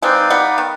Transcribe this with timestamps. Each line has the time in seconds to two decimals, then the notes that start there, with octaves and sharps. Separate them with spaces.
0.02 G#3 C4 D#4 B4 D5 F5
0.30 G3 B3
0.58 D#3